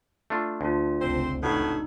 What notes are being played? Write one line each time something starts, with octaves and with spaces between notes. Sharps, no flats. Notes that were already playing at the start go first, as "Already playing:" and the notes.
A3 D4 F4
D2 D4 F4
F1 C#2 C4 C5
A2 B3 D4 D#4 F#4